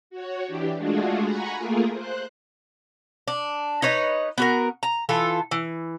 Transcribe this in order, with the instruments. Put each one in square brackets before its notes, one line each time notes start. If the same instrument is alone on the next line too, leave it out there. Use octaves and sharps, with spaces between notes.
[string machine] F#4 C#5
E3 D4 G4
G#3 A3 D4 F4 F#4 G#4
F#5 G#5 A#5 B5 C#6
A3 A#3 F4 G#4 A#4
C5 F#6
[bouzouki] D4
D#4 B4 C#5 D#5
B3 F#4 A#4
A#5
E3 F4 A4
E3